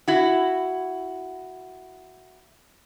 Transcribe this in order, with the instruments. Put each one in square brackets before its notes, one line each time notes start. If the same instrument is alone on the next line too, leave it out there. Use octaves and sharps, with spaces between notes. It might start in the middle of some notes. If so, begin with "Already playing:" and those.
[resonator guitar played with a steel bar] E4 F#4